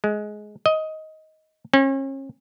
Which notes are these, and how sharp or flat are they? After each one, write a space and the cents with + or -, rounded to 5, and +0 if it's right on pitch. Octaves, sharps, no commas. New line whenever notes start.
G#3 +15
D#5 +15
C#4 -40